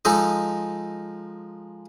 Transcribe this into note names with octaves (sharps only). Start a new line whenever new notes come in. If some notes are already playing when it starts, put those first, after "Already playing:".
F3 G#3 D#4 A4 D#5